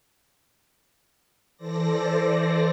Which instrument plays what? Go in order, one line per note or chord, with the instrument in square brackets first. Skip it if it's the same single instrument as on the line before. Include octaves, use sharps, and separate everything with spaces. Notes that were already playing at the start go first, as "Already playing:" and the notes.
[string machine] E3 A4 C5 D5 A#6